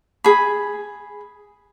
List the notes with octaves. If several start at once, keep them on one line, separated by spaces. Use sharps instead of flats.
G#4 B5